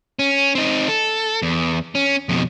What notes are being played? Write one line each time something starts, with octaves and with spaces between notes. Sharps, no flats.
C#4
C4 D#4
A4
E2
C#4
F2 B2